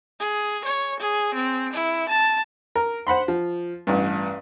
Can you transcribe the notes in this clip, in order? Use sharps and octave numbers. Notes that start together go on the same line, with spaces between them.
G#4
C#5
G#4
C4
E4
A5
A#4
C5 F#5 B5 C6
F3
A1 G2